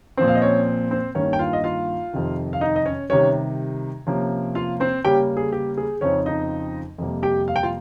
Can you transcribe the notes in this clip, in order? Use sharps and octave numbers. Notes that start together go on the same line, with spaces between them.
A#2 F3 C4 C5
F5
D#5
C#4 C#5
C4 C5
G2 D#3 A#3 C#4 C#5
G5
F4 F5
D#5
F4 F5
F2 C3 D#3
F5
D#4 D#5
D#5
C#4 C#5
C3 D#3 G3 C#4 C#5
C3 F3 A#3 C#4
F4 F5
C4 C5
C#3 G3 A#3 C#4 G4 G5
G#4
G4
G#4
F2 C#3 F3 C4 C#4 D#4 C#5
D#4 D#5
F2 C3 G3 A#3
G4 G5
F5
G5
F4 F5